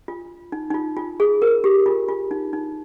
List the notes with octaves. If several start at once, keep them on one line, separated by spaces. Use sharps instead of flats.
F4
D#4
D#4
F4
F4
G#4
A#4
G4
F4
F4
D#4
D#4